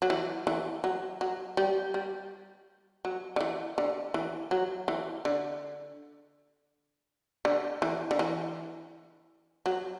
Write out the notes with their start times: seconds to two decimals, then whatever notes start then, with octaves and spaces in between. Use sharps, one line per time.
0.02 F#3
0.10 E3
0.47 E3
0.84 F#3
1.21 F#3
1.57 G3
1.94 G3
3.05 F#3
3.36 D3
3.41 E3
3.78 D3
4.14 E3
4.51 F#3
4.88 E3
5.25 D3
7.45 D3
7.82 E3
8.11 D3
8.19 E3
9.66 F#3